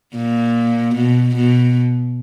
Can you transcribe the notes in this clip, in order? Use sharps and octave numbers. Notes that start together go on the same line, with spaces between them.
A#2
B2
B2